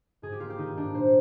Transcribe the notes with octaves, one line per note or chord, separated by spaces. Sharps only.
G#2 G#4
G4
A#3 F4
G4
D#3 D#4
G#2 D4
A#2 C5